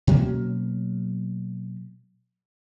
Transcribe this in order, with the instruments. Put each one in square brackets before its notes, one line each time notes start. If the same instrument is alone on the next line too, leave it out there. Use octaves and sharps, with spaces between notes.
[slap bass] B2 F#3 A#3 C#4